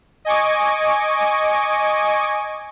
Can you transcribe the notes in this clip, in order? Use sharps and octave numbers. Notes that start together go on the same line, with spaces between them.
D#5 G#5 C#6 D6